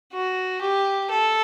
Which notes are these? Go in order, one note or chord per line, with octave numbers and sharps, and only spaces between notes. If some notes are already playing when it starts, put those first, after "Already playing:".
F#4
G4
A4